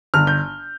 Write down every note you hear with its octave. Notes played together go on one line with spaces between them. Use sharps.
G1 F6
G6